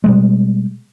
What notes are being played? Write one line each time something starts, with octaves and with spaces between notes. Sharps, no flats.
B2 G3 G#3